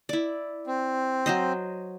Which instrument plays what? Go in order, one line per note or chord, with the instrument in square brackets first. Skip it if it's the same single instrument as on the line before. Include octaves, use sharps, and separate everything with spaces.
[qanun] E4 D5
[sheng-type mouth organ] C4
[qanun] F#3 C5 D#5